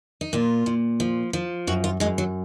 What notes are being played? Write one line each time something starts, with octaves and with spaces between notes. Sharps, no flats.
D#4
A#2 F4
A#2
F3
F3
F#2 F#4
F4
F#2 G#3
F#3